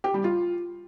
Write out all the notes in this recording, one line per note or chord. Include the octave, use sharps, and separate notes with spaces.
G4
G3
F4